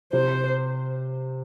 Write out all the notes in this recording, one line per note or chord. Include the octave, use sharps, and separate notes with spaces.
C3 C5